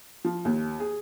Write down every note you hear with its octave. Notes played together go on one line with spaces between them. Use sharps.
F3
D#2
G#4